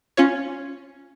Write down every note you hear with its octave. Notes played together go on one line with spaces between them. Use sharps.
C#4 F4 C#5